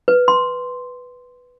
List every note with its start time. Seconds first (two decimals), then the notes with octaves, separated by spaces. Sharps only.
0.08 B4
0.28 C6